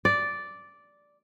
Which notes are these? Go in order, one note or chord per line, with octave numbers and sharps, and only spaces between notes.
D5